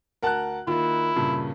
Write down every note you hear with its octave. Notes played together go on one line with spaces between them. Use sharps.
D2 A#4 F#5 A5 F#6
D#3 A#3 E4 F4
G2 A#2 C#3